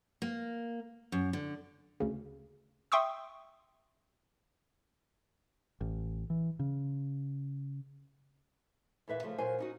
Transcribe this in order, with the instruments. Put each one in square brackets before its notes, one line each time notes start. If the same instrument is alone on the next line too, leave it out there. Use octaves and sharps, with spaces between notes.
[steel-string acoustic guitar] A#3
F#2
D3
[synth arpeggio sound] D2 C#3
E5 G5 C6 C#6 D#6 E6
[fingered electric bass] A1
E3
C#3
[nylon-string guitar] E2 A#2 B4 E5
C#3 F3 A3
A#2 F#3 A#4 C5 G#5
C#4 D#4 F#4